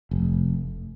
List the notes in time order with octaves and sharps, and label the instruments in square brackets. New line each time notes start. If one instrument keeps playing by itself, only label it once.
[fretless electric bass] F1